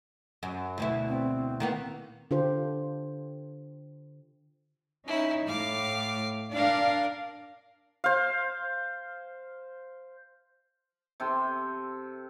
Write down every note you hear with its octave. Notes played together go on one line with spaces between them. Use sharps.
F#2
D2 B2 E4
C4
D#3 A#3 B3
D3 D4 F4 G4 C5
C#4 D#4 E4
A2 F5 D6
D4 A#4 D5 F5
C5 F5
C3 A4 G5 C6